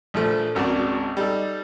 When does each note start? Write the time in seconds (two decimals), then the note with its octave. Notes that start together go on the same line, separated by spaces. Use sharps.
0.14 A#1 F3 A3
0.55 G#1 C#2 F#4 A#4 D5 A5
1.17 G3 D#4 A4